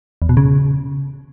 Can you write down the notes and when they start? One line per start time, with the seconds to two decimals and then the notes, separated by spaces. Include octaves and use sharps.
0.22 E2
0.29 B2
0.37 C#3